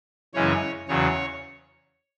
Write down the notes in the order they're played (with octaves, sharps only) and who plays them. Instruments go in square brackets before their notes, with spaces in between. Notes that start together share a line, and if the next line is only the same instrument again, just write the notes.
[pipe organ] F#2 C#3 E3 G#3 C#4 C#5
E2 C#3 F#3 C#5